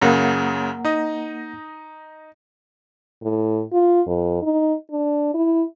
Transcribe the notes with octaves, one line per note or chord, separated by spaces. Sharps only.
F#2 C#3 A#3 F#5 A#5
D#4 D#5
A2
F4
F2
D#4
D4
E4